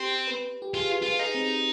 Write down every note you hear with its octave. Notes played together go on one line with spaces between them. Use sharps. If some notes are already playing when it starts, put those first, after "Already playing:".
Already playing: C4 G4
B4
G4
F4 G#4
F4 G#4
B4
D#4 G#4
C4